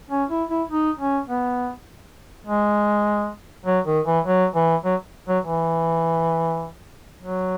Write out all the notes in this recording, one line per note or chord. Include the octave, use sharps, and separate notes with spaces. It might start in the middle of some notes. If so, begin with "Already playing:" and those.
C#4
E4
E4
D#4
C#4
B3
G#3
F#3
D#3
E3
F#3
E3
F#3
F#3
E3
F#3